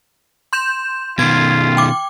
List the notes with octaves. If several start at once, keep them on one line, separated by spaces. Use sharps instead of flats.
C6 G6 E7
B2 D#3 F4 G#6
G5 D6